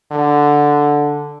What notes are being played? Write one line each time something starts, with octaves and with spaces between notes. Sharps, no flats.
D3